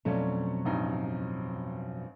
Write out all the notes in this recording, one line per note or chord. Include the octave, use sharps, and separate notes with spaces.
F2 B2 F#3 A3 C#4 D4
A1 G2 D#4